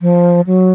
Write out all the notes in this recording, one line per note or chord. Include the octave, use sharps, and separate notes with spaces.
F3
F#3